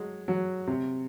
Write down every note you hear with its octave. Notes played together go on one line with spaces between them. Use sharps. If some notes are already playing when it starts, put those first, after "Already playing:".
Already playing: F#3 G#3
F#3
C3